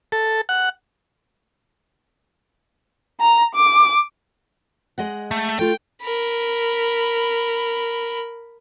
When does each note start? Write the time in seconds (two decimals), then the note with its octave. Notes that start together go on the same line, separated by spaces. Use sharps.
0.12 A4
0.49 F#5
3.20 A#5
3.55 D6
4.98 G#3 D#5 F#5
5.31 A3
5.59 A3 F4 G5
6.02 A#4 B5